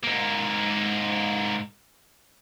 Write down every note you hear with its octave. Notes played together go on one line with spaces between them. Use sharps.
G#2 A#3